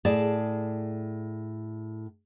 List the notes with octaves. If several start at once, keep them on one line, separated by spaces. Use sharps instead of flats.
A2 G#4 D5 A5